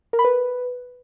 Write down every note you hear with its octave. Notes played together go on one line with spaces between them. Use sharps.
A#4
B5
B4